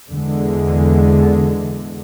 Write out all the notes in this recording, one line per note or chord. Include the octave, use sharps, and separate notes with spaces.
E2 D3 G#3